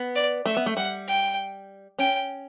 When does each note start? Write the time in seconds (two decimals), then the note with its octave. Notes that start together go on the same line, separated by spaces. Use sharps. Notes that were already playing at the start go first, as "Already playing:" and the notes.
Already playing: B3
0.15 D5
0.46 A3 E5
0.57 B3
0.66 A3
0.77 G3 F#5
1.08 G5
1.99 C#4 G5